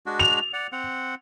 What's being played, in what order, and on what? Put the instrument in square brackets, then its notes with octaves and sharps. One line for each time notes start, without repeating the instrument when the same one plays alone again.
[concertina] G#3 D4 F#4
[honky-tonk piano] F7
[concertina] D5 F#5
C4 F#5